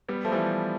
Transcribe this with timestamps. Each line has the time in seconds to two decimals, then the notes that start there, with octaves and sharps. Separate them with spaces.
0.09 G3 B3
0.25 F3 A3
0.32 E3 G3